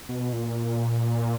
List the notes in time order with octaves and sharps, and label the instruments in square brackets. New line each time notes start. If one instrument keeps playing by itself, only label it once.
[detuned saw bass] B2
A#2